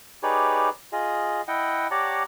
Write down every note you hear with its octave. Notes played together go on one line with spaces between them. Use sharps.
D#4 G4 G#4 B4 C#5 D5
F4 G#4 D#5
E4 D#5 F#5 G5
G4 C#5 D5 F#5 A5 A#5